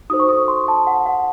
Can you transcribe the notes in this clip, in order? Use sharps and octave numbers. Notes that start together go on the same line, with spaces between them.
D#4 F#4 A4 C5 D#6
C#6
D#6
C6
A5
F#5
F#5